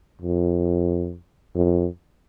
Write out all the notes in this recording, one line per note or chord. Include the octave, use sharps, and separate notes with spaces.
F2
F2